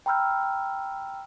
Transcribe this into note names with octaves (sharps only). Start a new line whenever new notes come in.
G5 A#5 B5 E6 F6 G6